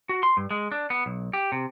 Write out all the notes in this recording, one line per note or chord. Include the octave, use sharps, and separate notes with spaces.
F#4
C6
G2
G#3
D4
B3
B1
G4
C3